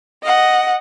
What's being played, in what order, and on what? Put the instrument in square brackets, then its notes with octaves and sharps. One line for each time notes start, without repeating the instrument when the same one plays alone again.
[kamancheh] D#5 F#5